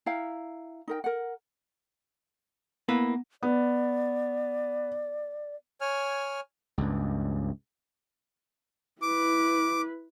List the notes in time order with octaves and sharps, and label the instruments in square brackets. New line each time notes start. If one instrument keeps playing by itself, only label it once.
[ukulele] E4 F5 G5 A#5
D#4 A#4 G5
A#4 F#5
[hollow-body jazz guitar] A#3 E4 B4 [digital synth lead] B3
[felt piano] B3 [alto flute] D5
[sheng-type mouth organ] C#5 G#5 F6
[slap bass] C#2 G2
[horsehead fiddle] E4 B4 [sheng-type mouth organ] D6